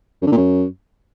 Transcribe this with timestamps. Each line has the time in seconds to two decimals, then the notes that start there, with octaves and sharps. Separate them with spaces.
0.21 F#2
0.26 D3
0.32 A#2
0.37 F#2